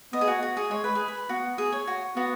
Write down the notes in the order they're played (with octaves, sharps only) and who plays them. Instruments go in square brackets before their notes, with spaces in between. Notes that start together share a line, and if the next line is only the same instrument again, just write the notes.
[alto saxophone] B3 [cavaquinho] D#5
[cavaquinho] G#4
F#4
F#4
G#4
[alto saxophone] G#3 [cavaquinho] C#5
[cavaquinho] B4
G#4
B4
[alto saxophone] B3 [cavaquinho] F#4
[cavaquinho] G#4
C#5
F#4
[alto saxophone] B3 [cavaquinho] F#4